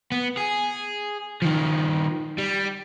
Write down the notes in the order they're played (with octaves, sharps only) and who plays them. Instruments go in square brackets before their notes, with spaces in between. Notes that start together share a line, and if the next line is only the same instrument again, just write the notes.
[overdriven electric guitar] B3
G#4
D#3 F3
G3